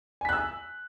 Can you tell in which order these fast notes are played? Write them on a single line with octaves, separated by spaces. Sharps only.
G#5 B6 F#6 E6